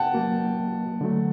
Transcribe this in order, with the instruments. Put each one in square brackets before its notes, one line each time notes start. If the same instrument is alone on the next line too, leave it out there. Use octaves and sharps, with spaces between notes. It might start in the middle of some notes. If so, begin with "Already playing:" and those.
Already playing: [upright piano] F#5 G5 A5
[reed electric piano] F#3 A#3 F#4
D3 F#3 A3